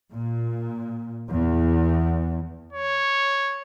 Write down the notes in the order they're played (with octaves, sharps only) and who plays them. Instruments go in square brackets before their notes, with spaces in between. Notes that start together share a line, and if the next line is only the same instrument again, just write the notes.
[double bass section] A#2
E2
[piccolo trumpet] C#5